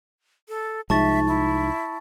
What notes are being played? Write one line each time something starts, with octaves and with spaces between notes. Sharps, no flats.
A4
C2 F3 G#3 D#4 E5 A5 C#6 A6
E4